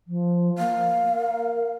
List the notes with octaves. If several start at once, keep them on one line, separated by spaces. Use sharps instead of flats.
F3
A#3 F5
A#4